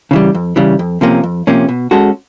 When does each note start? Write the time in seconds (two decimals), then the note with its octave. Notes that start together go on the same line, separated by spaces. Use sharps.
0.11 C#3 E3 G3
0.34 F2
0.56 C#3 E3 G3
0.79 F2
1.01 C3 F3 A#3 C#4
1.23 F2
1.47 C3 F3 A#3 C#4
1.69 B2
1.91 G#3 C#4 F#4 A4